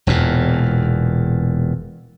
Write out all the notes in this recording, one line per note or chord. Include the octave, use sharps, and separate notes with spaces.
E1 E2 A#2